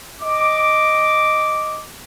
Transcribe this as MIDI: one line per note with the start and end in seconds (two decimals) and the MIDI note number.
0.20 1.81 75
0.20 1.81 86